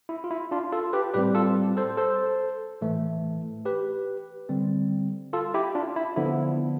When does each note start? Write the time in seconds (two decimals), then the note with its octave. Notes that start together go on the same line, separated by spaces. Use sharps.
0.09 E4
0.24 F4
0.31 E4
0.51 D4 F4
0.72 F4 A4
0.93 G4 B4
1.14 A2 G3 C4 G4 B4
1.35 F4 A4
1.77 A4 C5
1.97 A4 C5
2.82 A2 E3 A3
3.65 G4 B4
4.49 D3 G3 C4
5.33 F4 A4
5.54 E4 G4
5.75 D4 F4
5.96 E4
6.16 D3 F3 B3 E4